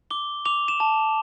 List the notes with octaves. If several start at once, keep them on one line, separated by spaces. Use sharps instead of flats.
D6 G7
D6 F7
E7
A5